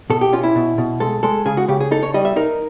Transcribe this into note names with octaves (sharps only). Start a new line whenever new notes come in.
B2 A4
G4
C#4 F4
E4
B2
B2
G#3 A4
G#3 A4
C#3 G#4
F#4
C#3 G4
G#4
D#4 A4
C#5
G3 D#5
E5
D#4 A#4